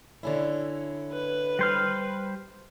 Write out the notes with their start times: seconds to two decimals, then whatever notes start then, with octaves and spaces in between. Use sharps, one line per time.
0.23 D3 C#4 E4
1.12 B4
1.59 G3 C5 F6